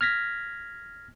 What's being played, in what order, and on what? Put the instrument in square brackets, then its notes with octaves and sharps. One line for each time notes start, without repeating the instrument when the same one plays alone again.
[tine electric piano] F6 G#6 A#6 B6